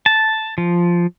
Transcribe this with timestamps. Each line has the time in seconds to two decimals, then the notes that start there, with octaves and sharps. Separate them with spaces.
0.06 A5
0.58 F3